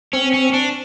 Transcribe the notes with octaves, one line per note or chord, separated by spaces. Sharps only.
C4 C#4
C#4
D4